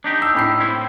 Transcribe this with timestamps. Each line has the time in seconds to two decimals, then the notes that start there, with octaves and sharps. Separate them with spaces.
0.04 D4 D#4 G4
0.22 E6
0.35 A2 B5 C7
0.60 C4 E4